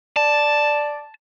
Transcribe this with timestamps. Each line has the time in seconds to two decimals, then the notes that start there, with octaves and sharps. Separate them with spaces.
0.16 D5 A5